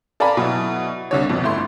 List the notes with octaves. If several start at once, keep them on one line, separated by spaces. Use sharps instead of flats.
A4 D5 F5 G#5 A#5 B5
B2 F#3 E4
C2 D3 C#5
F2 B2
G1 A3 E4 C6